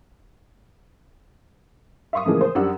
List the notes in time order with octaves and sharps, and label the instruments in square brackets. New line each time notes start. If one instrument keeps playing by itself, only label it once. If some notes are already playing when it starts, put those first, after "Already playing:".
[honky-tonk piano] E5 F5 C6 C#6 D#6
A2 C#3 E3 F3 G#3 A#3
C5
F#2 G3 D4 G4 F#5 E6